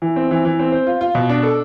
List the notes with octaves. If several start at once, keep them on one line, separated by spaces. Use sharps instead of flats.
E3
C4
E3
E3
C4
C5
F4
F4
B2
D4
A4